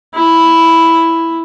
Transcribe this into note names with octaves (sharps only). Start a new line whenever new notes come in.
E4